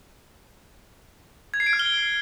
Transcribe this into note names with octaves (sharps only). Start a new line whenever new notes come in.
G#6
C7
D7
F6
G7